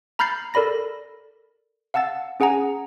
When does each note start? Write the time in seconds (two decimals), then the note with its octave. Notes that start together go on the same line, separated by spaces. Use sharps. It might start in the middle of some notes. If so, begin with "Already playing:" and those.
0.19 A#5 B5 F6 G6 A6 C7
0.54 A4 A#4 D5 B5 A#6
1.94 F5 F#5 A5 E6 A6
2.40 C#4 G#4 F#5 G#5 A#5